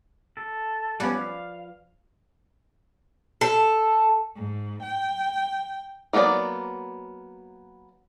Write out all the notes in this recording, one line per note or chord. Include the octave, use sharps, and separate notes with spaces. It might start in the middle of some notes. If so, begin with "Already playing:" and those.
A4
F3 G3 B3 C#4 B4 D5
F5
A4
G#2
G5
F#3 A#3 B3 D#4 D5